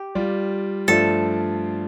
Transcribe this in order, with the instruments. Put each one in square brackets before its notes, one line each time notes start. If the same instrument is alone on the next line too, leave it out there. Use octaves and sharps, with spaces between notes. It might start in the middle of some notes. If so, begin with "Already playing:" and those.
Already playing: [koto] G4
[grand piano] G3 F4 D5
[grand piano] G2 F3 A3 F4 D5 [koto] A4